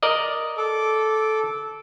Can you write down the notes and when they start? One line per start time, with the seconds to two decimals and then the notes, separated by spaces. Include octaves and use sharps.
0.03 A#4 D5 D#5
0.57 A4 D6